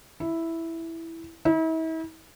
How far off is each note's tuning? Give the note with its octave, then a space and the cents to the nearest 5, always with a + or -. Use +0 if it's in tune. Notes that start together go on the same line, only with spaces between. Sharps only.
E4 +0
E4 -40